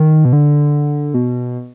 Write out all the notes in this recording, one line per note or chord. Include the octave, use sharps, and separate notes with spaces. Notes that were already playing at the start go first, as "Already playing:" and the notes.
Already playing: D#3
B2
D3
B2